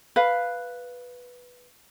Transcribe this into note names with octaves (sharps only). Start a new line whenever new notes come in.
B4 F5